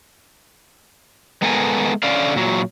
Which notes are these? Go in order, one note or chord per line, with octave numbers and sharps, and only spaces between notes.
G#3 B3 A4 A#4 G5 G#5
D3 C#4 D5 F5
A#2 F#3